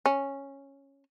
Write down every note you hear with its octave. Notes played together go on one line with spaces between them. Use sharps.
C#4